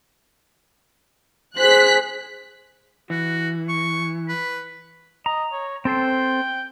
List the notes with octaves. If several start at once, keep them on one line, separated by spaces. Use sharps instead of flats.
G#4 C5 F#6 B6
E3 F#4
C#6
B4
D#5 A#5
C#5
C4 A4 C5 G5